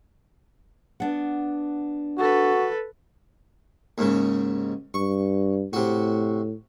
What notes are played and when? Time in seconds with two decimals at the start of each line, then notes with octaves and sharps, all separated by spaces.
1.00 B3 D4 F#5
2.18 F#4 A4 B4
3.98 D#2 G#2 C#3
4.94 G2 C#6
5.73 A2 C3 F#4